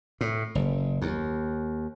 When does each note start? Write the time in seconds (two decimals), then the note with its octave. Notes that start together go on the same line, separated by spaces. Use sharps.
0.21 A2
0.55 F#1
1.02 D#2